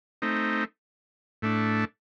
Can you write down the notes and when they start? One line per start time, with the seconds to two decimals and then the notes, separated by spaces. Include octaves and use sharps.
0.22 A3 C4 D#4
1.42 A2 A3 D4